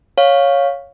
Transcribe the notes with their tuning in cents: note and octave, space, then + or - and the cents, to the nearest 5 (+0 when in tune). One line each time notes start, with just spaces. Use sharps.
C#5 +0 F5 +5